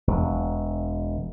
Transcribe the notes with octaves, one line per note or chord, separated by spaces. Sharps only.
E1